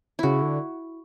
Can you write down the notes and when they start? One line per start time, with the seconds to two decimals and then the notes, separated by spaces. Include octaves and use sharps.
0.19 C#3 E4 F#4
0.42 D3